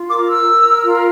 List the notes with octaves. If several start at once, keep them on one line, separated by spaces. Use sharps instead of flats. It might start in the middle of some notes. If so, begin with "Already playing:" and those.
Already playing: F4
A#4 D6
E6
A#4
F4